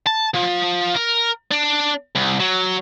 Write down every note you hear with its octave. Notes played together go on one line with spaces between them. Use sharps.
A5
F3
A#4
D4
C2
F#3